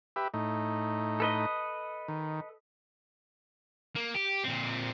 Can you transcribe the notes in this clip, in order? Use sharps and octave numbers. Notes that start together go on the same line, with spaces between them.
G4 B4 E5
A2 D#4
A4 B4 D#5
D#3
A#3
G4
A#2 C4